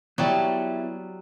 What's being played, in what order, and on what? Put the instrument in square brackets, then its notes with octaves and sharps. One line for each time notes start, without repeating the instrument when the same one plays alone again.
[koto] F#3 G3 A5 [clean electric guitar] B3 E4 G4